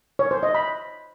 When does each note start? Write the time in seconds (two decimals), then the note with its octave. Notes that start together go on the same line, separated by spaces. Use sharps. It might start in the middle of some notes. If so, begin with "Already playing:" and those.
0.19 C#5
0.31 C5
0.43 D#5
0.55 B5